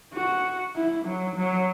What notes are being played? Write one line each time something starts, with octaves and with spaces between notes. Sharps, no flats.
F#4
E4
F#3
F#3